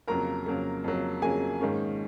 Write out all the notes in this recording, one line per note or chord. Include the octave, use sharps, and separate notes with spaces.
F2 C#3 F#3 A#3 A#4 A#5
F2 C#3 F#3 A#3
F2 C#3 F#3 A#3
F2 C#3 F#3 A#3 G#4 G#5
G#2 D#3 A#3 C#4